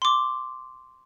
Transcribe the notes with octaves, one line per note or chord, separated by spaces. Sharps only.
C6 D6